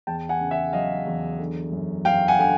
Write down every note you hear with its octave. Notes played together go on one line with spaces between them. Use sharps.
E2 G5 A5
F#5 G#5
C#3
E5 F#5
F#3 D#5 F5
E2
D3
F#2
F#2 F5 G5
F#5 G#5
D3 G#5